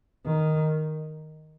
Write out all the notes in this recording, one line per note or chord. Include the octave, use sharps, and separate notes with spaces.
D#3